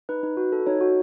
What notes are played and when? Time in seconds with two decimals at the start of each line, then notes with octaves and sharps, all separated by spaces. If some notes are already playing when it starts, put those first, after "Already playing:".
0.09 D#4 B4
0.23 D#4
0.37 F#4
0.52 A4
0.67 D#4 C#5
0.81 F#4